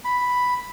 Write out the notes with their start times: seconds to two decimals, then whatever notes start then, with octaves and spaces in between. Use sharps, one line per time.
0.05 B5